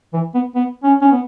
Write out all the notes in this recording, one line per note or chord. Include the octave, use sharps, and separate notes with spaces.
E3
B3
B3
C#4
C#4
B3